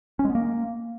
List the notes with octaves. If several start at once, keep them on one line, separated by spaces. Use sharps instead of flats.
C#4
G#3
B3
A#3